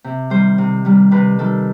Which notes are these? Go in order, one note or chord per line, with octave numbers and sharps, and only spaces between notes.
C3
D#3 G3 C5
C3
D#3 G3
C3 B4
D#3 G3 A4